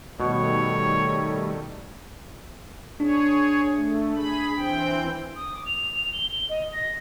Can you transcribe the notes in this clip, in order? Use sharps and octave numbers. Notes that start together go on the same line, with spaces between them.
B2 D#3 G3 A3 C#5
D4 G#4 C#5
A3
G#4 B5
E3 C4 G5
D#6
D6
F7
G7
D#5
A#6